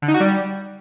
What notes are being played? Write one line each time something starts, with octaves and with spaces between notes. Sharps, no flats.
D3
D#4
F#4
G3